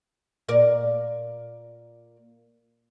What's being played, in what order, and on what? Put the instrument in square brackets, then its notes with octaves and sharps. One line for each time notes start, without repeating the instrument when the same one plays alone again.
[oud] A#2 A#4 D5